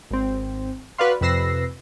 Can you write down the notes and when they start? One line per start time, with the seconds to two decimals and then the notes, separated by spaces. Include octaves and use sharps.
0.11 G#1 C4
0.98 F#4 B4 D5 F5 C6
1.21 F2 C3 B4 E6 A#6 C7